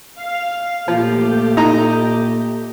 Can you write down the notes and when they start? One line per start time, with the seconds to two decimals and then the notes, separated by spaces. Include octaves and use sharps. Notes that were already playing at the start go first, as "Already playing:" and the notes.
0.19 F5
0.88 A#2 F3 A3 G4
1.57 D#4 A#5